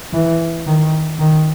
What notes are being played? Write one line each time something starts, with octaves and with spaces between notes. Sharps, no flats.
E3
D#3
D#3